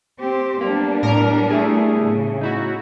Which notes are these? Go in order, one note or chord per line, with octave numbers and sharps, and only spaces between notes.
C4 G4 C5
G3 A#3 B3 D4
A2 A#4
A3 E4 G#4
A2 C#3
D#4 E4 F#4